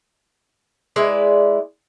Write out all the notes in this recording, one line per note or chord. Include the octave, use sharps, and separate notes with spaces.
G#3 E4 B4 D5